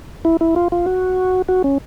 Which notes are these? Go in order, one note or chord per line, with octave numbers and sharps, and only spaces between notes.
E4
E4
F4
F4
F#4
F#4
C#4